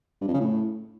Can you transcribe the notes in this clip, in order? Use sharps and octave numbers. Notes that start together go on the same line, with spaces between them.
G2
F2
C#3
A2